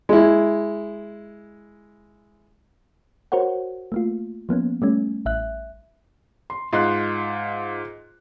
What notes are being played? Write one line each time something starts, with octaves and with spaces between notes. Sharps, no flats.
G#3 E4
F#4 A#4 C5 C#5 F#5
A3 A#3 F4
F3 A#3 B3 C#4
G3 A3 C#4
A1 E5 F#6
C6
G#2 F4 D#5 C6 F#6